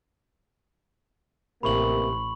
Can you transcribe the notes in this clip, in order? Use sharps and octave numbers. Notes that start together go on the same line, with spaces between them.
A1 C3 A#3 B5 C#6 F#7